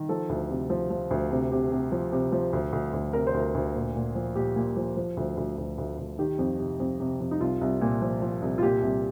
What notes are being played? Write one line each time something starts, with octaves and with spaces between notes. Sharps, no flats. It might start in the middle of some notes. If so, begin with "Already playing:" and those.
Already playing: D#3
F3 A4
D2
C3
F3
F3
D2
C3
C3
C3
F3
C3
F3
D2
D2
D2
C3 A#4
C5
D2
A#4
D2
A#2
A#2
F3
A#2 G4
A#2
F3
F3
D2
D2
D2
D2
D2
D#3 G4
F2
C3
F2
C3
F2
D#4
C2 F4
C2
A#2
F3
F3
C2
F4
A#2 G4
C2